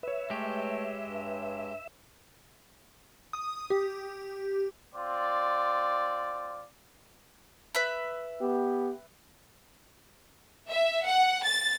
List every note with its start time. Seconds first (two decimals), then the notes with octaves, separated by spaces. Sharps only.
0.03 B4 C#5 E5
0.30 G#3 A3 G4
1.08 G2
3.33 D#6
3.70 G4
4.94 C4 F4 D5
7.75 B4 E5 B5
8.41 B3 G4
10.70 E5
11.05 F#5
11.44 A6